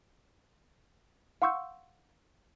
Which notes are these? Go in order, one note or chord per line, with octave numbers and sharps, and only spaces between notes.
F5 F#5 C6 C#6 E6 G6